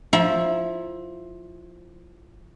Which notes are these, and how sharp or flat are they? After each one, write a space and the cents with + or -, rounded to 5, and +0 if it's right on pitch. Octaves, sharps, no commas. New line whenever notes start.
F3 +10 E4 +0 A#5 +40